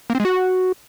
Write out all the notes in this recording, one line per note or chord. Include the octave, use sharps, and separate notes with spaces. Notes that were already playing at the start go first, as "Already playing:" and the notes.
A#3
C4
G#3
F#4